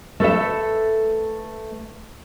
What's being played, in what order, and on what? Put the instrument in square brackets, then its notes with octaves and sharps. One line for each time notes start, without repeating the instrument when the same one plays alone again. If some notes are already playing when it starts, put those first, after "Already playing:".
[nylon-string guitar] A3 A4 B4 E5